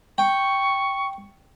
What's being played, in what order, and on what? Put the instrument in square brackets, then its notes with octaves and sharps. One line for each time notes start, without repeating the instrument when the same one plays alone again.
[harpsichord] G5 [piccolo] C#6